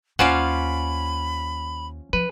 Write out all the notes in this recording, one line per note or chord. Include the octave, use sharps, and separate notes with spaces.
D#2 C#4 F4 C5 D5 F5 F#5 B5
F3 B4